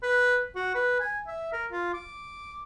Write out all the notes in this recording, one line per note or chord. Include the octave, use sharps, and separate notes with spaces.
B4
F#4
B4
G#5
E5
A#4
F4
D6